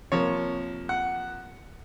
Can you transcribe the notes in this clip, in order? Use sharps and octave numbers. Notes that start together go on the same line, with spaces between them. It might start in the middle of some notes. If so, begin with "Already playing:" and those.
C3 F3 A#3 C#5
F#5